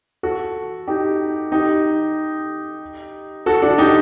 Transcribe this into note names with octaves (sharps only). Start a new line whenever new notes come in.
F#4 A4
D#4 G4
D#4 G4
F#4 A4
D4 F#4
D#4 G4